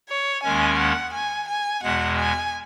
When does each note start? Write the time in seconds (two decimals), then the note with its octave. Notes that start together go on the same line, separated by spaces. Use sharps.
0.09 C#5
0.43 D#2 D#3 G#3 C#4 G#5
0.78 F#5
1.13 G#5
1.48 G#5
1.83 E2 B2 G#3 F#5
2.18 G#5